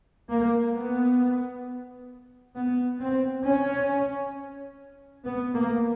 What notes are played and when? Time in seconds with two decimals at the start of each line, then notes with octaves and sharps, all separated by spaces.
0.30 A#3
0.75 B3
2.56 B3
3.00 C4
3.46 C#4
5.26 B3
5.55 A#3